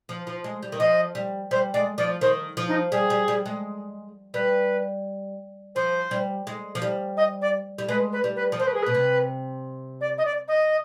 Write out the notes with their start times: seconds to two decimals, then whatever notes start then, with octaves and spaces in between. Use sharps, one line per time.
0.09 F3
0.27 F3
0.44 G#3
0.62 G3
0.72 D#3
0.79 F3 D#5
1.15 G3
1.51 G3 C5
1.74 G#3 D5
1.98 F3 D5
2.21 D#3 C5
2.57 F3
2.68 D#4
2.92 G3 G#4
3.10 G3
3.28 G3
3.46 G#3
4.34 G3 B4
5.75 F3 C5
6.11 G3
6.47 G#3
6.75 F3
6.82 G3
7.17 D#5
7.42 D5
7.78 G3
7.89 G#3 B4
8.13 B4
8.24 G3
8.36 B4
8.52 F3
8.59 D#3 C5
8.67 B4
8.74 G#4
8.83 B2 B4
8.94 C3
10.01 D5
10.18 D#5
10.25 D5
10.48 D#5